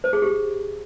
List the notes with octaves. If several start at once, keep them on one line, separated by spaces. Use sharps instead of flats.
C5
G#4
G4